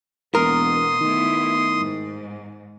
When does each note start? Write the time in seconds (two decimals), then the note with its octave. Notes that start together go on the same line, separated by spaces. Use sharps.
0.35 E1 B2 A#3 B3 A#4 C6 D#6
1.01 D#3 A3 B3 E4
1.81 G#2